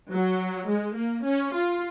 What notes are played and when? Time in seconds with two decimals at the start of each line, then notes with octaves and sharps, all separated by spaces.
0.11 F#3
0.69 G#3
0.97 A#3
1.25 C#4
1.54 F4